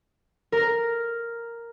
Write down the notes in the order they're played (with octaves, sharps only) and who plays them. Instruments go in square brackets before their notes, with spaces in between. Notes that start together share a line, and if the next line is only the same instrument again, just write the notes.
[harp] A#4